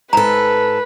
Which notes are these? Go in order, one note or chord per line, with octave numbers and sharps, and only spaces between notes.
G#2 A4 B4 A#5